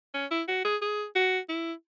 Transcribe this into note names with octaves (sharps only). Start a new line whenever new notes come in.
C#4
E4
F#4
G#4
G#4
F#4
E4